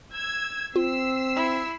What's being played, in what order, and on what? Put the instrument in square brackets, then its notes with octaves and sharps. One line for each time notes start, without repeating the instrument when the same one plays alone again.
[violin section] E6 G#6
[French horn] C4 [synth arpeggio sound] F4 [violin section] E6 B6 C7
[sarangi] E4